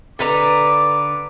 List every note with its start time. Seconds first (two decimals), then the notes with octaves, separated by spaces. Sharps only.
0.19 D3 B4 A#5 D6